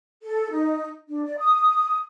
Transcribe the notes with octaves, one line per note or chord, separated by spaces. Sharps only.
A4
D#4
D4
D5
D#6